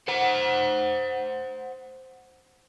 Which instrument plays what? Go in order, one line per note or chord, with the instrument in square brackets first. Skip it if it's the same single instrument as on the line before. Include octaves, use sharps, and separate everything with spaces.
[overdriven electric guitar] C5 F#5